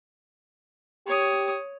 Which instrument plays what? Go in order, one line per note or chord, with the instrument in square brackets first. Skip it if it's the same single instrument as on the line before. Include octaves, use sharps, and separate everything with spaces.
[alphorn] G4 [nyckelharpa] C#5 D#6